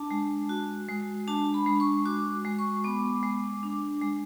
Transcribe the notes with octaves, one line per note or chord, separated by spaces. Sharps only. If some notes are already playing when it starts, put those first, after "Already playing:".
Already playing: D4 A5
G#3
F#4
G#3
D4 A5
B5
G#3
C#6
F#4 D6
G#3
C#6
B3 D6
G#3
D4
G#3